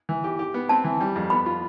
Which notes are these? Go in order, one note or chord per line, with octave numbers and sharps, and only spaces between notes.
E3
G4
G4
B3
C4 A5
E3
G3
F2
B3 B5
F4